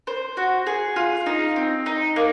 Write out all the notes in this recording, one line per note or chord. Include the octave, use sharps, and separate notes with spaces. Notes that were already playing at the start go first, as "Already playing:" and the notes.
C5
F#4
G#4
F4
D#4
C4
D#4
A#3